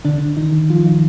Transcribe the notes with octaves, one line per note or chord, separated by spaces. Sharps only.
D3 D4
D#3 D#4
F3 F4
D#3 D#4